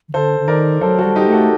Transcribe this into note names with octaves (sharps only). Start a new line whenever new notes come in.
D#3
D3 A4 C5
D3
D#3 A#4 D5
F#3 A4 C5
F#4 A4
G3
D#4 G4
A3
F#4 A4